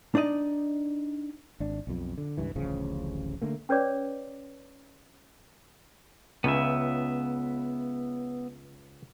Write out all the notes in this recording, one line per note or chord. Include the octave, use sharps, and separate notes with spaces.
D4 D#4 D5 D#5
G#1 D4
B1 F2
D3
C#2 G2 E3
D1 A1 C#3 F3
D3 A3 A#3
C#4 B4 C#5 D5 D6
C#2 C#3 B3 E5